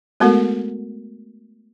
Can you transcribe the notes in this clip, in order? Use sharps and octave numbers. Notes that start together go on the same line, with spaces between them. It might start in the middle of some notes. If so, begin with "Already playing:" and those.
G#3 A3 B3 F#4 A4 A#4